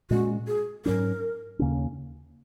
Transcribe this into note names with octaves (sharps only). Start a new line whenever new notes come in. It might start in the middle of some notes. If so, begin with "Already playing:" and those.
A#2 G#3 C#4 F#4
G#4
G#2 F#3 C#4 A#4
D#2 C#3 A#3 C#4